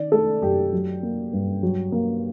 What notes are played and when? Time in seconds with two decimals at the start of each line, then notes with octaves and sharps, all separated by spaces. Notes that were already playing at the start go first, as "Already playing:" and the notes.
Already playing: D#3 D5
0.12 A3 A4
0.42 F#2 G4
0.73 F#3
1.03 A#3
1.33 G2
1.63 F#3
1.92 A#3